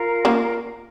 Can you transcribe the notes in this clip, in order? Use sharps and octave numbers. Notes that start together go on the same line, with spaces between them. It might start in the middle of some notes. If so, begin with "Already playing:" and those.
Already playing: F4 A#4 F5 A#5
A#3 C#4